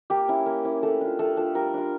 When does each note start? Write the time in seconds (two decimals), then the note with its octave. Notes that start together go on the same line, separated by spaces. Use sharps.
0.10 A#3 G4
0.28 C#4 E4
0.46 A#3
0.65 C#4 E4
0.83 A3 A4
1.01 D4 F4
1.19 A3 A4
1.37 D4 F4 A4
1.55 G3 A#4
1.74 D4 F4